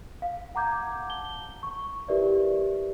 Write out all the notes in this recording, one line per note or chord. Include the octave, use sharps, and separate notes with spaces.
F5
F#5 A#5 D6 G6 G#6
A5 G7
C#6
E4 G4 A#4 B4 D5 E5